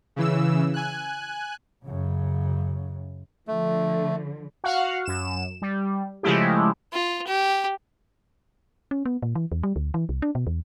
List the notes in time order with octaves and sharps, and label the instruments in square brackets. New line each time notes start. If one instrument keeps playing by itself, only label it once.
[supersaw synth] C#3 E3 E6
G#5 F#6
[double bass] F#2 C#3
[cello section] D3 F3 [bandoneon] A3
[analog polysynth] F#4 F5 F#5
F#2 E7
G3
C#3 F3 G#3 A3 E4 G4
[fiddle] F4
G4
[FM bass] C#4
B3
A#2
E3
E2
G3
D2
E3
C2
D4
B2
E2